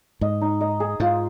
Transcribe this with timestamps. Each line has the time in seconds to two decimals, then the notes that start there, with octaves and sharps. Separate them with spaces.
0.21 G#2 D#5
0.41 D#4
0.61 D#5
0.80 G#4
1.00 G#2 F4